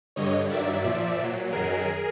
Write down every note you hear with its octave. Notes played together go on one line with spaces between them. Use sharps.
G2 D3 G3 C#5 D#5
G2 D#3 F#3 D5 E5
A#2 F3
A#2
F#3
F#2 D#3 F#3 G#4 A#4